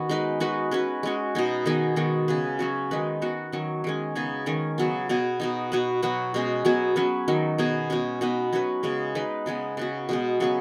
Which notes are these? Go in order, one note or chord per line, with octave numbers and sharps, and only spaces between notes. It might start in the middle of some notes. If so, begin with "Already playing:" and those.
Already playing: D#3 B3 C#4 F#4
G#3 D#4 B4
G#3 D#4 F#4 B4
G#3 C#4 F#4 B4
G#3 C#4 F#4
B2 B3 D#4
D#3 B3 D#4 G#4
D#3 G#3 B3 F#4
C#3 B3 G#4 B4
F#3 C#4 F#4
D#3 G#3 D#4 B4
D#3 B3 F#4
D#3 F#3 C#4
D#3 G#3 C#4
C#3 B3 D#4 G#4
D#3 G#3 C#4
C#3 F#3 B3
B2 B3 G#4
B2 B3 D#4
B2 B3 F#4 B4
B2 F#3 B3 F#4
B2 G#3 C#4
B2 F#3 B3 G#4
F#3 C#4 B4
D#3 F#3 D#4
B2 B3 G#4
B2 G#3 C#4
B2 B3 D#4 B4
F#3 C#4 F#4 B4
C#3 G#3 B3
G#3 D#4 B4
C#3 G#3 B3 D#4
C#3 B3 F#4
B2 G#3 B3
C#3 F#3 B3 G#4